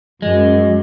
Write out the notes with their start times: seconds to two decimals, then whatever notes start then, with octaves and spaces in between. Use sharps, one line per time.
0.22 F#2 G#3